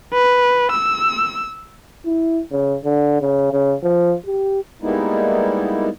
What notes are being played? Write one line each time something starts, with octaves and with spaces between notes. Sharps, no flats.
B4
E6
E4
C#3
D3
C#3
C#3
F3
G4
G3 G#3 A#3 B3 D#4 E4